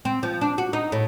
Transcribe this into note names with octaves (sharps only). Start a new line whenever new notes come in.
C4
F3
D4
F#4
D#4
A2